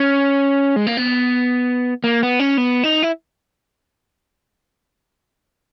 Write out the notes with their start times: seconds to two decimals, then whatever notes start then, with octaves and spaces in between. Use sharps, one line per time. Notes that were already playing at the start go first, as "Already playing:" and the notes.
Already playing: C#4
0.76 G#3
0.87 A#3
0.97 B3
2.04 A#3
2.23 B3
2.39 C#4
2.57 B3
2.84 D#4
3.03 E4